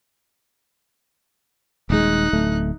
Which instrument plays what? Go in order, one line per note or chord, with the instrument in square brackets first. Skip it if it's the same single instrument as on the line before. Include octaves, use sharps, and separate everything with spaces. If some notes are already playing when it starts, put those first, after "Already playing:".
[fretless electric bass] D#1 G#3 [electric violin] D#4 F#6
[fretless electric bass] D1 A3